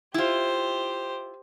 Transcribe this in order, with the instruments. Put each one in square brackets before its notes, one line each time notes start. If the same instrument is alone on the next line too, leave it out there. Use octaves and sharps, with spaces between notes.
[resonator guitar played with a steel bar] E4 F4 [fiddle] G4 C5